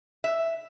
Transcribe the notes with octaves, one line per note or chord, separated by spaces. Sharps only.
E5